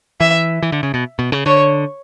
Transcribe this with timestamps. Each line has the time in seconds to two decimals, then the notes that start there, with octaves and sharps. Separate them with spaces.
0.20 E3 E5
0.62 E3
0.72 D3
0.83 C#3
0.94 B2
1.19 B2
1.32 C#3
1.46 D3 C#5